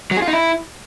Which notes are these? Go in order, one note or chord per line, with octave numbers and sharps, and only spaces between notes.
F#3
G#4
F4
D#4
E4